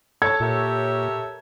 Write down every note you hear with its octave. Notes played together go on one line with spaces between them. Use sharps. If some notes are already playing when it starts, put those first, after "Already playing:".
A4 C#5 A5 G#6
A#2 G4 A#4 E5